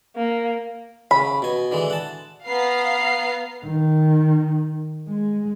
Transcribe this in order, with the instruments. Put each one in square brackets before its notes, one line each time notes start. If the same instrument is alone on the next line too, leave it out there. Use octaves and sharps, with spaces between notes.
[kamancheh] A#3
[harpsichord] C#3 [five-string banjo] B5
[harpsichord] B2 G#5
D3 E3 G#3
F#5 A5
[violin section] B3 F5 A#5 C7
[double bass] D#3
G#3